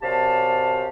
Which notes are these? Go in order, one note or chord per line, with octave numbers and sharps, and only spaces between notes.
F#2 C3 G4 D5 F5 A5